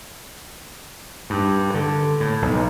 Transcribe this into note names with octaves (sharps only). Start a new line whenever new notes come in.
G2
D3
A2
B1